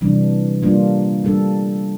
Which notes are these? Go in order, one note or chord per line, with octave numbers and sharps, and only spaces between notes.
C3 E3 G3 D4
G3 A#3 D4 F4
G3 D4 A4